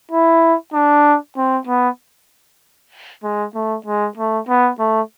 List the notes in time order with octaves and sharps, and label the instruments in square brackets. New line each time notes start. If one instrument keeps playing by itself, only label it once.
[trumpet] E4
D4
C4
B3
G#3
A3
G#3
A3
B3
A3